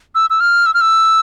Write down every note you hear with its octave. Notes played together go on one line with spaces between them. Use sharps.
E6
E6
F6
E6
F6
E6